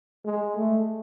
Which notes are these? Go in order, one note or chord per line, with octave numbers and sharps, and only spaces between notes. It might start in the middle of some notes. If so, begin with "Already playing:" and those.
G#3
A3